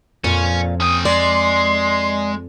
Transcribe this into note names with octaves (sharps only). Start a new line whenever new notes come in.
F2 A#2 C#4 F5
C#4 G5 D#6
G#3 D5 C6